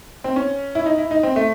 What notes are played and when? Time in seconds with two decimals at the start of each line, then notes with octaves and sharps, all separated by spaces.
0.24 C4
0.36 C#4
0.75 E4
0.86 D#4
0.98 E4
1.11 D#4
1.23 C4
1.36 A3